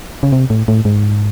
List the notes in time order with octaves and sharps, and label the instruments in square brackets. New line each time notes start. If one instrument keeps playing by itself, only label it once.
[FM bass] C#3
C3
A2
A2
G#2